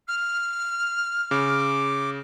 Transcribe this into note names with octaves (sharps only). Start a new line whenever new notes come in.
F6
C#3 D6